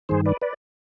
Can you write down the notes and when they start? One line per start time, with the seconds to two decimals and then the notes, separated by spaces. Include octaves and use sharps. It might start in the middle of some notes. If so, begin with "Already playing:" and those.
0.09 G2 D#3 G#4 C5
0.26 B4 D5
0.42 B4 D5